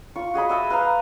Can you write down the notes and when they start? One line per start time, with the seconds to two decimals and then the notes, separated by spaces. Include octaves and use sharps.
0.16 F4 C#6
0.34 F#4 G#4 D#5 B5
0.49 D#5 E5 A5
0.70 B4 F5 A#5